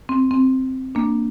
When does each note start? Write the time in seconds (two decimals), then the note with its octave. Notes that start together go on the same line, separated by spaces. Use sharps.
0.09 C4
0.31 C4
0.95 A#3 D4